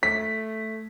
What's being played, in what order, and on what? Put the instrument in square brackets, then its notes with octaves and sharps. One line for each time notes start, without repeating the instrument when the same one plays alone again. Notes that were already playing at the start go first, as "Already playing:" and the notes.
[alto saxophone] A3 [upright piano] B6